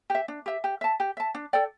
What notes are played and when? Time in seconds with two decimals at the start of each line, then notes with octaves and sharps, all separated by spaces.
0.10 G4 E5
0.28 D4
0.46 G4 E5
0.64 G4
0.81 E5 A5
1.00 G4
1.17 E5 A5
1.34 D4
1.53 A4 D5 G5